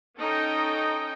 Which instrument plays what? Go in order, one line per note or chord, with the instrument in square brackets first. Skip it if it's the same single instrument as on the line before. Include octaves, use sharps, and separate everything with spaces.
[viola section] C#4 D#4 A4 D#5 G5